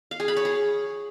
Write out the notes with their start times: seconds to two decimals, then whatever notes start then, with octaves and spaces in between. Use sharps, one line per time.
0.11 F5
0.20 G#4
0.28 B5
0.37 C#5
0.45 G#4